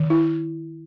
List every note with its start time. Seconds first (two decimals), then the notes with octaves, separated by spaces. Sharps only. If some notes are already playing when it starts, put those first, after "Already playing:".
Already playing: D#3
0.10 E4